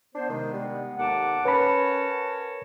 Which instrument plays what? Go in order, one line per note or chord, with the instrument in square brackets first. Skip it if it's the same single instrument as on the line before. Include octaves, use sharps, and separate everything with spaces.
[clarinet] B3 [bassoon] D4 [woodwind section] C5
[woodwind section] C3 G#3 [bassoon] D#3
[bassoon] G3
[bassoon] D#2 [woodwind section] A4 A5 D6 [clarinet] F#5
[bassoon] C#4 [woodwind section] A#4 F#5 A5 [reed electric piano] B4 B5 [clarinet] C#5